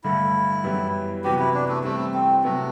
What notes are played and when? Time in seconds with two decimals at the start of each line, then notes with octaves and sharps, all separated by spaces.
0.04 G2 D3 A3 E4
0.64 F#2 E3 G3 B3
1.24 C3 E3 B3 F#4 G4 B4
1.39 E4
1.54 D4
1.69 A3
1.84 E3 G3 A3 C4
2.14 C4
2.44 C3 F#3 A3 B3